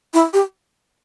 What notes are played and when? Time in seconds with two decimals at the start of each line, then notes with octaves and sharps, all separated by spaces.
0.14 E4
0.33 G4